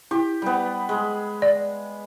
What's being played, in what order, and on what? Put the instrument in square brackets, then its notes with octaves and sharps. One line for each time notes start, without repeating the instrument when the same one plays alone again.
[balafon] E4 [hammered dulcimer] G4
[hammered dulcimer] G3 B3
G#3
[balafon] D5